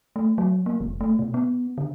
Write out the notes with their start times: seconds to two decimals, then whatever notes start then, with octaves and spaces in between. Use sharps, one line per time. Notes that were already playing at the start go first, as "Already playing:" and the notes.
0.16 A3
0.38 F#3
0.66 A#3
0.81 F1
1.01 A3
1.19 B2
1.34 B3
1.78 D3